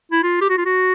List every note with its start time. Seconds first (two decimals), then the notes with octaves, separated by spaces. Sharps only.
0.11 E4
0.23 F4
0.41 G4
0.49 F#4
0.57 F4
0.65 F#4